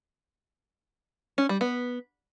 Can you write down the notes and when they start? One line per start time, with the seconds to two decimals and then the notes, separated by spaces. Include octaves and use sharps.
1.38 C#4
1.49 G3
1.61 B3